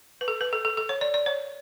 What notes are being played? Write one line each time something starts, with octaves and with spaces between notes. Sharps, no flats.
B4
A4
B4
A4
A4
A4
C#5
D5
D5
C#5